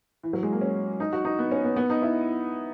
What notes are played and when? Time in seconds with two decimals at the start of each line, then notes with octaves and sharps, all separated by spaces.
0.23 E3
0.33 F#3
0.43 G#3
0.52 A#3
0.61 C#4
1.00 D#4
1.13 F#4
1.25 D#4
1.39 B3
1.51 C#4
1.64 B3
1.76 B3
1.90 D#4
2.02 E4